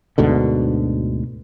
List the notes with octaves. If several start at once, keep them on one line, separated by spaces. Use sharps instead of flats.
D2 G#2 B2 D3